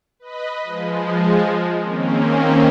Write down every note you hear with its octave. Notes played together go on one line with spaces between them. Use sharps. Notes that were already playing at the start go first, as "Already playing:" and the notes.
B4 D#5 B5
F3 G#3
D#3 A#3 C4 C#4